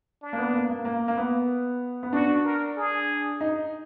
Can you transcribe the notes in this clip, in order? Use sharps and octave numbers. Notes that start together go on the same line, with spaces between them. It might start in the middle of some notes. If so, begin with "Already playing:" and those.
D4
A#3
B3
A#3
A#3
A#3
A#3
B3
B3
D4 F#4
A#4
G#4
D#4